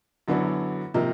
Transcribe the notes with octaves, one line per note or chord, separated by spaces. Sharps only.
F#2 D3 F#3 B3 E4
C3 F3 A#3 D#4